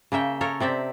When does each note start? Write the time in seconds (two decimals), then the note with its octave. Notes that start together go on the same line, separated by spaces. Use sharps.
0.12 C#3 A#3 E5 G5
0.41 A4 A#4 C#5
0.60 C3 C4 D5 E5